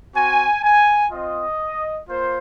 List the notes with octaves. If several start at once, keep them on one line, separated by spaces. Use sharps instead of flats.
C4 F#4 G#5
G#5
C4 F4 D#5
A#3 F4 C5